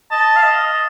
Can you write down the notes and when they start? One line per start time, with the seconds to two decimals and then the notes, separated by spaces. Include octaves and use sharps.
0.11 D#5 A5
0.37 F5
0.44 D#5